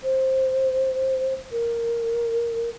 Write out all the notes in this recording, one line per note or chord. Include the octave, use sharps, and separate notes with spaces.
C5
A#4